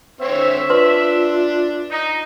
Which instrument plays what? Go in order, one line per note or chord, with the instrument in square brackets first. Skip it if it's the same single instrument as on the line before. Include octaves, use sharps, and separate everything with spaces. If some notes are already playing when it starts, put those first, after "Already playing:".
[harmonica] D3 C4 C#5 [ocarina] C5 [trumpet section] E5
[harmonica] D4 [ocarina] F4 [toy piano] B4 C6
[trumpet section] D#4